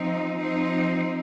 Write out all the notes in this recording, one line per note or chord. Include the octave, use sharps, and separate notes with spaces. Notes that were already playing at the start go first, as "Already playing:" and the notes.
Already playing: F3 C4 D#4
F3 C4 D#4